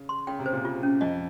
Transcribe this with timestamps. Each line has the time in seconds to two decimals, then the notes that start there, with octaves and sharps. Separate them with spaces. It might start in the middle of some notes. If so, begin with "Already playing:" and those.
Already playing: C#3
0.09 C6
0.27 C#3 G5
0.39 C3
0.46 C5
0.52 A#2
0.65 F4
0.83 C#4
1.01 F2 D#5